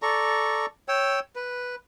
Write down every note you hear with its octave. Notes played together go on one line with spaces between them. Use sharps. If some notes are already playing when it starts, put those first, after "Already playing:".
A4 D5 A#5 C#6
C#5 G5 E6
B4